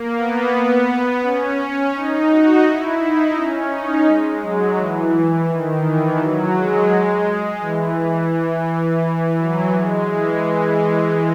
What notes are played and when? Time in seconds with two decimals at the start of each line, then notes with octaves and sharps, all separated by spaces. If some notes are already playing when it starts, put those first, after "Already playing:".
Already playing: A#3
0.17 B3
0.88 B3
1.22 C#4
1.94 D#4
2.29 F#4
2.65 E4
2.99 D#4
3.36 C#4
3.71 D#4
4.06 G#3
4.41 F#3
4.76 E3
5.48 D#3
5.82 E3
6.18 F#3
6.53 G#3
7.25 G#3
7.61 E3
7.95 E3
8.66 E3
9.37 F#3
9.72 G#3
10.08 E3